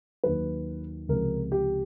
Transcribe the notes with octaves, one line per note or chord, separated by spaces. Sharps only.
D#2 D#3 F#3 B4
C#2 C3 F3 A#4
G4